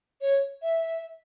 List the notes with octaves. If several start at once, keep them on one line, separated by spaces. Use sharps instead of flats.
C#5
E5